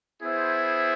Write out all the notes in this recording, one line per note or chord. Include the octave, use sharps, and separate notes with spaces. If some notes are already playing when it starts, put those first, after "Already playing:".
B3 E4 G#4 C5 E5